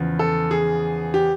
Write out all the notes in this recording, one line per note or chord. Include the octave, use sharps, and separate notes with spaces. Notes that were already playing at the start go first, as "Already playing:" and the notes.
Already playing: E2 C#3 F3
A4
G#4
G4